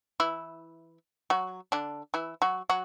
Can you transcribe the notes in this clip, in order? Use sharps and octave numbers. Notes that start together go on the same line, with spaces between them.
E3 E4
F#3 F#4
D3 D4
E3 E4
F#3 F#4
F#3 F#4